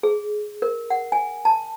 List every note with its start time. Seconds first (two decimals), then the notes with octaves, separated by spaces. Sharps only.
0.03 G#4
0.62 A#4
0.90 F#5
1.12 G#5
1.45 A5